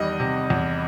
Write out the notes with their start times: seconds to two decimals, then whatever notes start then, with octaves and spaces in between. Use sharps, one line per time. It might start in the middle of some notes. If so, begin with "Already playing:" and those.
Already playing: E2 D#3 G3 D#5
0.20 C3
0.50 E2